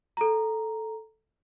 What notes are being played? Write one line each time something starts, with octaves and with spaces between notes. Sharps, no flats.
A4 A#5